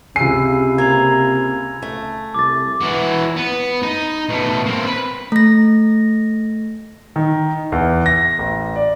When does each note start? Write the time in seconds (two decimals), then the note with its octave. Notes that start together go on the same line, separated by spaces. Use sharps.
0.16 C#2 C3 G#5 E6 C7 D#7
0.78 A#3 G#6 F7
1.82 A3
2.34 C2 D6 A6
2.82 E3 F#4
3.37 B3
3.83 D#4
4.29 B2 A3
4.66 A#3 C4
4.87 B4
5.32 A3 A#6
7.16 D#3
7.72 E2
8.06 A#6
8.39 A1
8.76 D5